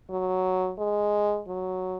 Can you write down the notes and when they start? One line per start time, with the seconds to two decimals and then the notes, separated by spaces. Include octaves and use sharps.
0.10 F#3
0.79 G#3
1.48 F#3